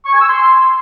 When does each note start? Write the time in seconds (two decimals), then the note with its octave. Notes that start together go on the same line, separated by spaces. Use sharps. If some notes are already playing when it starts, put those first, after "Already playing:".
0.06 C#6
0.13 G#5
0.21 E6
0.29 C6